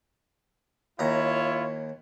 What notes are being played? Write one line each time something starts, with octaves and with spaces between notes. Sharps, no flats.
D#2 E4 F4 C#5 A#5